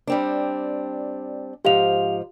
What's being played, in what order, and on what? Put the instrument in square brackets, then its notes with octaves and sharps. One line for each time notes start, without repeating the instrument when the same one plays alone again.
[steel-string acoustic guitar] G3 C4 D4
[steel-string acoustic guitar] G#2 F3 [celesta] G4 F5 F7